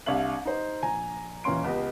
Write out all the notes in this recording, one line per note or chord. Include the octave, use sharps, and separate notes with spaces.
C2 D4 E5 F5 F#7
D#4 C5
A#1 G#5 A#5
D#1 E3 A#3 C#4 C6 D7
C#2 B3 G4 D#5